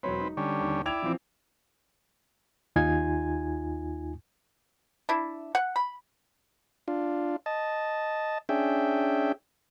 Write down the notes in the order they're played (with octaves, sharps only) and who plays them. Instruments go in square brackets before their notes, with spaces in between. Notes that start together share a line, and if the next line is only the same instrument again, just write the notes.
[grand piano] E1 F#3 C#5 [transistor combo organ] C4 B4
[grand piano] D#4
[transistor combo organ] D3 G3 C#4
[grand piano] D#2
[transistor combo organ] E4 D5 [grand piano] G5 G#6 F7
[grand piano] E3 F3 C4
[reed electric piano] D#2 D#4 F4 G#5 G#6
[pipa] D4 E4
F#5
B5
[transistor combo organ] D4 F4
D#5 A5
C#4 D4 G#4 E5 G5